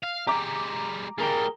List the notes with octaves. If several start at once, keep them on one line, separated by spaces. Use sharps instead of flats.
F5
G#3 G4 A#5 D6
G3 A#3 G#4 A#4 G5